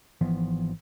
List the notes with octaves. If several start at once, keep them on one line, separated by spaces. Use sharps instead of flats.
G#1 E3 F3 B3